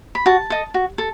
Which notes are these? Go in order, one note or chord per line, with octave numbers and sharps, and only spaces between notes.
B5
F#4 A5
A4 D#5
F#4
A4